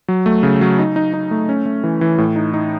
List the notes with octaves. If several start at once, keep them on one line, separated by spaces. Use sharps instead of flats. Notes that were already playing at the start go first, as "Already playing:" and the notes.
F#3
A3
C#3
F#3
D#4
D#4
D#4
A3
C#4
A3
E3
E3
A2
D#4
D#4